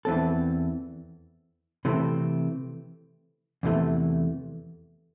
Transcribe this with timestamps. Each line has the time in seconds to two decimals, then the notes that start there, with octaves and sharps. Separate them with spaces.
0.05 E2 E3 C4 A4
1.85 C3 E3 A3 C4
3.63 E2 C3 E3 A3